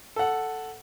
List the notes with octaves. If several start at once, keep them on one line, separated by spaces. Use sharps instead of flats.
A4 F#5